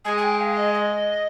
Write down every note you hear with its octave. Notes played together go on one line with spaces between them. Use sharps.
G#3 G#5
G#5
G5
F5
D#5
D#5